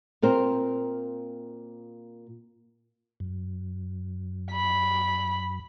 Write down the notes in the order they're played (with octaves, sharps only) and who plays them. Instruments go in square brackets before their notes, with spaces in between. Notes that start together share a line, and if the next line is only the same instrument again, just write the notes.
[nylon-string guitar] A#2 C4 A#4 C5
[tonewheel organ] F#2
[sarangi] B5